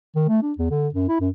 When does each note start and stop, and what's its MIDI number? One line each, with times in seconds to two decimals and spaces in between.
0.16 0.24 51
0.29 0.42 57
0.43 0.53 62
0.58 0.68 40
0.71 0.88 50
0.94 1.08 42
1.09 1.20 64
1.21 1.29 42